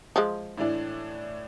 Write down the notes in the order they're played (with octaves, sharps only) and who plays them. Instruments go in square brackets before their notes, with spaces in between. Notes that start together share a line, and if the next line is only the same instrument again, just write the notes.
[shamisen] F3 G#3
[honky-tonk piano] A2 E3 D4